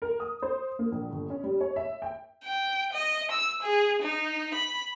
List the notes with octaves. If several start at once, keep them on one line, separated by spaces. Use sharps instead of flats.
A#4
D#6
C5
A#3
A#1
G1
C#4
G3
C#5
E5
G5
G5
D#5
E6
G#4
D#4
B5